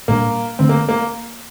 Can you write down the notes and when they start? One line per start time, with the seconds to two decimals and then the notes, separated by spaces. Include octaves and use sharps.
0.08 A#2 G3 A#3 D4
0.59 D3 A3 C4 D4
0.69 A#3
0.89 A#3